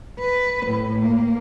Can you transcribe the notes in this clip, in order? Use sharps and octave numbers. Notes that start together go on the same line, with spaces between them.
B4
A2
A#3